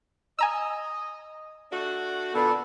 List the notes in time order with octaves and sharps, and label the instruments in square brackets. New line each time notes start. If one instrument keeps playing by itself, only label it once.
[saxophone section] D#5 [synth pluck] G#5 A#5 E6
[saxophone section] A3 D4 F#4
[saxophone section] A#2 D3 [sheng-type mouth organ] B3 A4